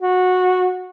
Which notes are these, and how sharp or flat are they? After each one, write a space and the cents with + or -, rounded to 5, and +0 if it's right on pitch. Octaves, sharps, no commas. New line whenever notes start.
F#4 -15